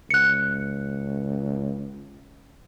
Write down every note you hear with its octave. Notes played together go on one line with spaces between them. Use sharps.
C#2 F#6 C#7